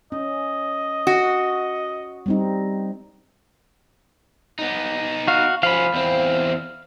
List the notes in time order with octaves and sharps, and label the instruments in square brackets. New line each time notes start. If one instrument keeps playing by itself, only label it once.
[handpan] C#4 [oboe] D#5
[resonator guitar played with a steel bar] F#4
[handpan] G3 C4 D#4
[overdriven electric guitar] B3 D#4
[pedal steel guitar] F#4 F5
[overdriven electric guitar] F3 C#4 [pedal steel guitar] F5 B5
[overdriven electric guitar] E2 C4